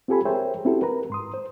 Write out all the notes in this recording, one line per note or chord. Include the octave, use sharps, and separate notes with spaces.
C4 F4 G4 A4 G#5 B5
G#4 A#4 C5 C#5 E5 G5
C4 C#4 E4 F#4 G4 A4
A#4 B4 A#5
G#2 C6 D#6
C5